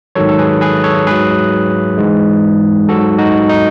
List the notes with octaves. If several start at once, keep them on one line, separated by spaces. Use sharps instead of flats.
G#2 D#3 F#3 A4 C#5
A4
G#4 B4
G#4 B4
A4 C#5
G#2 F#3 G#4 B4
G#2 E3 G#3
G#2 F#3 F#4 A4
D#4 F#4
D#4